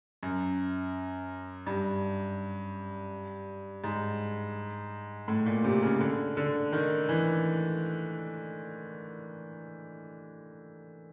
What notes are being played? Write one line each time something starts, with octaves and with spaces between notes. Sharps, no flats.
F#2
G2
G#2
A2
A#2
C3
C#3
D3
D3
D#3
E3